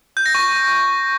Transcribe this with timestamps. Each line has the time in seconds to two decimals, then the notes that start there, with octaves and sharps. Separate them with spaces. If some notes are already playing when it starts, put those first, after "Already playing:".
0.17 G6
0.26 A#6
0.35 C#6